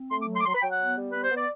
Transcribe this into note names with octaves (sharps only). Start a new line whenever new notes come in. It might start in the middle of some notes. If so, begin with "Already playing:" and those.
Already playing: C4
A3 C6
D6
F#3
C6
D6
F#3 C6
B5
F#3 G5
F#5
B3
G3
B3 B4
C5
B3
D5